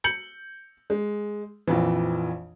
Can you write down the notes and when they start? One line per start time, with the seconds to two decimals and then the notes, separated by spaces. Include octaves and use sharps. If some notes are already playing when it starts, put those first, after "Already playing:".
0.04 G6 C#7 F#7
0.90 G#3
1.67 A#1 F2 E3